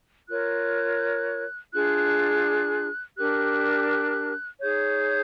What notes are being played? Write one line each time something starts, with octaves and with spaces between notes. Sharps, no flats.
F4 A#4 C#5 F#6
D4 F4 G#4 F#6
D4 G4 A#4 F#6
D#4 G#4 C#5 G6